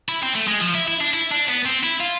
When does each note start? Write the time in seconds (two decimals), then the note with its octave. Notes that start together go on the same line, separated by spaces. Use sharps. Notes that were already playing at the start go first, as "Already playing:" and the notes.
0.09 E4
0.23 C4
0.35 A3
0.48 G#3
0.61 F3
0.75 E4
0.88 E4
1.01 D4
1.14 E4
1.31 D4
1.48 B3
1.65 C4
1.84 E4
2.00 F4